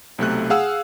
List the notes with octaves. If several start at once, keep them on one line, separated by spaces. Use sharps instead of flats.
B1 C3 A3 F#6
G#4 F5 F#5 E6